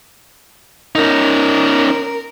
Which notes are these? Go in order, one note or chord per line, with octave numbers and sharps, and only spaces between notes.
C#4 D#4 A#4